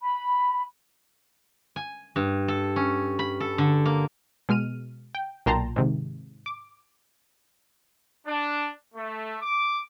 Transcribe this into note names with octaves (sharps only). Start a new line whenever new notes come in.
B5
G#5
G2
A4
C#4
B5
A4
D3
A#3
B2 G#3 F6 D#7
G5
B1 A#2 G5 A5 A#5 C6
G#2 C3 D#3
D6
D4
A3
D6